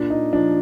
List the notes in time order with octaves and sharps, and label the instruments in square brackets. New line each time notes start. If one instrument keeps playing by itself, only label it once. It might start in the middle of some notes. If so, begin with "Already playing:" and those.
Already playing: [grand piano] A#2 D4
D#4
F3 D4